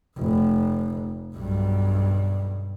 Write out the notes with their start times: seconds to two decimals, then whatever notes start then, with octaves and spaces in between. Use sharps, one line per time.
0.18 F1
1.35 B1 G2